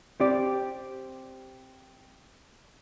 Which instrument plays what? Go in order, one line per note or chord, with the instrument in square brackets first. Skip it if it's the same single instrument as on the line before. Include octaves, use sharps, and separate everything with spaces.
[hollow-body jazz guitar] C4 G4 D5